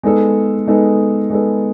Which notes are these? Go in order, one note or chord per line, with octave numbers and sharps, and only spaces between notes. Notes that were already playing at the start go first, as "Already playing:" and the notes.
G#3 B3 D#4 A4
G#3 B3 D#4 A4
G#3 B3 D#4 A4